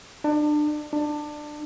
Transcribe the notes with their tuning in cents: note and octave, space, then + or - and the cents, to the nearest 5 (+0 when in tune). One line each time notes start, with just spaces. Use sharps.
D4 +30
D4 +20